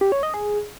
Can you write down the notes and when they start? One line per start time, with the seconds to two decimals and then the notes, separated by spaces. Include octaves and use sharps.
0.01 G4
0.12 C#5
0.23 D#5
0.34 G#4